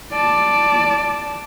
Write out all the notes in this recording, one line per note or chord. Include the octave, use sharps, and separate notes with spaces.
D5 A5